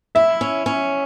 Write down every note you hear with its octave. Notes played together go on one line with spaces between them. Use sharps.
E4 E5
C#4
C#4